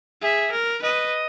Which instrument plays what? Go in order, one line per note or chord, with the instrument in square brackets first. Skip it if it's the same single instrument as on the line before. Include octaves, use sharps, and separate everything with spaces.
[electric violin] G#4 [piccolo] E5
[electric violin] A#4
[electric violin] B4 [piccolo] D#5